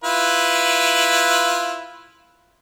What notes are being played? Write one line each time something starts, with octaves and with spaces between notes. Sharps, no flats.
E4 F4 B4